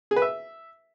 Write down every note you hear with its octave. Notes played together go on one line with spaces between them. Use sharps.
G#4
B4
E5